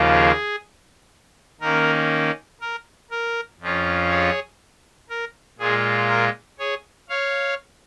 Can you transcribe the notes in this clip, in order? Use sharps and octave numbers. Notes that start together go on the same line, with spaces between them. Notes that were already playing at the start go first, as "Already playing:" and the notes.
Already playing: D#2 C#3 F3 A#3 F4
G#4
D#3 A#3 C#4 A#4
A#4
A#4
F2 F3 C#4 F4
G#4 C#5
A#4
A#2 G#3 F4 G#4
A#4
G#4 C#5
C#5 F5